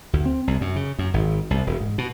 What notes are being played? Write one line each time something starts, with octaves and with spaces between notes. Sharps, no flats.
D2
C4
C2
F#2
C#3
F#2
G#1
C2
E1
G#2
B2